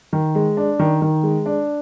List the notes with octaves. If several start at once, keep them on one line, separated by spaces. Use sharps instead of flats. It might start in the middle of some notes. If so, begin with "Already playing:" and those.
D#3
G#3
D4
D#3
D#3
G#3
D4